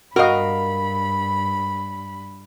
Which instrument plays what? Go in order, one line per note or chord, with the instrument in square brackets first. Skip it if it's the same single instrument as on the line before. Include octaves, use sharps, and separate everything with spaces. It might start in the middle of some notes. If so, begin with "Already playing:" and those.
[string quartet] G2 B5 [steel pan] F#4 D#5 [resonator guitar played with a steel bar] A#4 F5